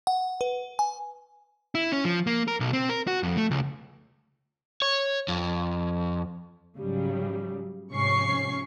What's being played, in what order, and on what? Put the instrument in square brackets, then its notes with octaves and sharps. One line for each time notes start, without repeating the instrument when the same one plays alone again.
[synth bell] F#5
B4
G#5
[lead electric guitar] E4
C#4
F3
A#3
A#4
B1
C4
A#4
F#4
F2
A3
C#2
[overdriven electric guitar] C#5
F2
[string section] G#2 C#3 F#3 G3
G#2 C3 F3 C#4 C#6 C7